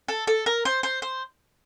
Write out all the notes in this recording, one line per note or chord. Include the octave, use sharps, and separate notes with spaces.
A4
A4
A#4
C5
C5
C5